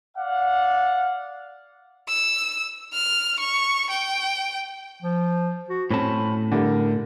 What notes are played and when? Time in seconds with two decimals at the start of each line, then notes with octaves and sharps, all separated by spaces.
0.18 D5 F5 F#5
2.08 E6
2.93 F6
3.40 C#6
3.90 G5
5.03 F3
5.70 F#4
5.91 A2 C4 C#4 A5 B5
6.52 D3 G3 A3 A#4